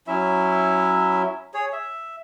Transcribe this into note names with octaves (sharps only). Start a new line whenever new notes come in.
F#3 C#4 E4 E5
G#4 C#5
E5